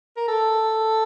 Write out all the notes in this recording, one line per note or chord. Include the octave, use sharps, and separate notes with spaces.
A#4
A4